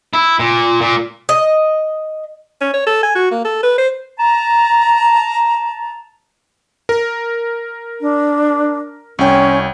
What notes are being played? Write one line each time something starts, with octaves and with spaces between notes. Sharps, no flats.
E4
A#2
A#2
D#5
C#4
C#5
A4
G#5
F#4
A#3
A4
B4
C5
A5 A#5
A#4
D4
C2 C#4 G5